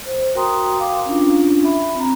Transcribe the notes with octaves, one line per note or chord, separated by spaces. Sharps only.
C5
F#4 A#4 G5 A#5 C6 D#6
F5 G5 D6
C#4 D4 F4
E5 B5
C4 A#5